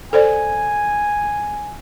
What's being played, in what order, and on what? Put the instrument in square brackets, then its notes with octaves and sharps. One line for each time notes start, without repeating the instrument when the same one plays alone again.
[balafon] A4 C5 D5 [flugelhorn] G#5